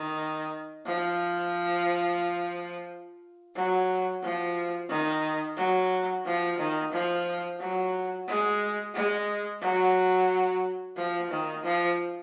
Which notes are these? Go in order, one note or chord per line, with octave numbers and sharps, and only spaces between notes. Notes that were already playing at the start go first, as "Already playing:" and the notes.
Already playing: D#3
F3
F#3
F3
D#3
F#3
F3
D#3
F3
F#3
G#3
G#3
F#3
F3
D#3
F3